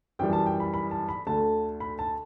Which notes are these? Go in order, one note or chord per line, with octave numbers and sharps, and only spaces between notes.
F#2 E3 G3 G5
A5
G5
B5
B5
A5
B5
D2 D3 A3 A5
B5
A5